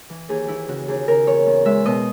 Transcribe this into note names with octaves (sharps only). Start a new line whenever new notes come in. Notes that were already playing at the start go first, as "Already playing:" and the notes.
E3
D#2 G#4
E3 E4
C#3 F#4
D#2 G#4
C#3 A#4
E2 C#5
E2
G#3 E5
B2 D#5